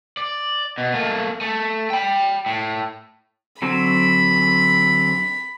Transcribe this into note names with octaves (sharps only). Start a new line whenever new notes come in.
D5
B2
A3 A#3
A3
G5 B5
A2
D3 F#3 C4 B5